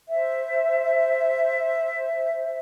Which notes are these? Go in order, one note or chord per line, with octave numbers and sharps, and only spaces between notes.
C5 E5